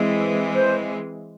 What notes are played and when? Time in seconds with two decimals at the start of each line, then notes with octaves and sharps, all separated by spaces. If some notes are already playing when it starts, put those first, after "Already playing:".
Already playing: E3 G#3 C4
0.54 C5